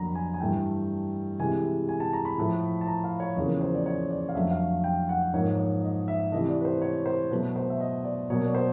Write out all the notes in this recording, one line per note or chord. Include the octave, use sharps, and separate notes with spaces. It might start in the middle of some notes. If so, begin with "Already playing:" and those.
Already playing: F2 D3 F#3 A#3 A#5 B5
G#5
G#5
G2 E3 A3 G5
C3 E3 G#3 G#5
G#5
A5
A#5
B5
A2 F3 A3
A5
A#5
F5
C#5
E2 C#3 F3 A#3 C#5
C5
D5
C#5
D5
F5
F2 D3 F#3 A3 E5
F5
G5
F#5
G#2 F3 A#3 C#5
C#5
D#5
E5
C3 E3 A3 D#5
D5
B4
C5
C#5
C5
B2 F#3 A3 B4
C5
E5
D#5
D5
B2 F#3 A#3 C#5
D5
C5